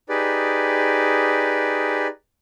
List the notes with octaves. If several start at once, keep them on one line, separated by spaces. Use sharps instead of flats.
D#4 G4 G#4 B4 D5